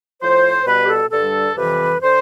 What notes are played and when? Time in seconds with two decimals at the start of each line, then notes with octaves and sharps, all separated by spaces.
0.21 A2 F3 C5
0.66 B2 G3 B4
0.83 G4
0.89 A4
1.12 G2 D3 G3 A4
1.57 F2 C3 E3 G3 B4
2.02 D3 C5